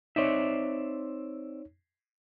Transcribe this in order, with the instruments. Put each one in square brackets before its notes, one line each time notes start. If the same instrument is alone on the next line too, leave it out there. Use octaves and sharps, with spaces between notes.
[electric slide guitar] C4 D5 E5 [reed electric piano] D#4 C#5